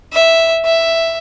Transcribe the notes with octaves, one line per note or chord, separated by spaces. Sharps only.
E5
E5